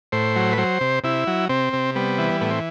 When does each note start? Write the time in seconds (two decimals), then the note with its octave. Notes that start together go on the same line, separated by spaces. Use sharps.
0.12 A2 C5
0.36 F#3
0.53 B4
0.58 F#3 C5
0.81 C3
1.04 C3 E4
1.27 F#3
1.49 C3 C4
1.73 C3
1.95 G3 B3
2.18 E3
2.41 A2 B3
2.50 C4